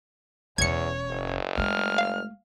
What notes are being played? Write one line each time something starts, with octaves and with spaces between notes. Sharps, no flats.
E1 E2 C#4 C#5 G#6 C#7
F#1
G#3 A3 F6
F5